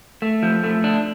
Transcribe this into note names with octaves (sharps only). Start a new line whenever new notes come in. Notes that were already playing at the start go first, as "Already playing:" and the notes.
A3
F3
A3
D4